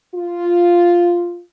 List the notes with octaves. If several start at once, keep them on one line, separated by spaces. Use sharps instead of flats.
F4